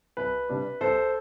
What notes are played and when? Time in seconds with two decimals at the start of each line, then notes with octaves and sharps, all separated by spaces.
0.17 C2 B4
0.49 C3 G3 D4
0.81 C2 A4 C5